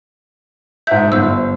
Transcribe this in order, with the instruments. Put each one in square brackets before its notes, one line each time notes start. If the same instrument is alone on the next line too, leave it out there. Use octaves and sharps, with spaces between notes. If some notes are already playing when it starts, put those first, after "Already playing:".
[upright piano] G#2 E5 [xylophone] G6
[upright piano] G1 [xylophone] C5 E6